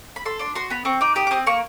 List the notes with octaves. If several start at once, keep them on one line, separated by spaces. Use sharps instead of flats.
B5
A4 C6
D4 C6
F#4 C6
B3 B5
C4 C#6
D#4 D6
G4 D#6
D6
C4 D#6
A#3 C#6